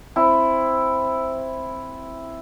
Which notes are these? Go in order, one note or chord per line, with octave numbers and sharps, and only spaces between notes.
C4 E4